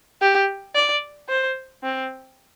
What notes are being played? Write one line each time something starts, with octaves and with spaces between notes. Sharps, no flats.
G4
D5
C5
C4